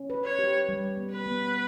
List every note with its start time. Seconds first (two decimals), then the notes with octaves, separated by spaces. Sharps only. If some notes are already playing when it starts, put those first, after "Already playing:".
Already playing: C#4
0.10 B4
0.25 C#5
0.39 G4
0.69 G3
0.97 B3
1.12 B4
1.26 B3